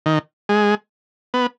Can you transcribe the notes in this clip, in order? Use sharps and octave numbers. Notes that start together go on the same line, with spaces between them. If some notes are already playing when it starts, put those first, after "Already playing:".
D#3
G#3
B3